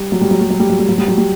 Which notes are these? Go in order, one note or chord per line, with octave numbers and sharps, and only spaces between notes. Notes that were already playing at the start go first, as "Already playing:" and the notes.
Already playing: G3
F#3
G3
F#3
G3
F#3
G3
F#3
G3
F#3
G3
F#3
G3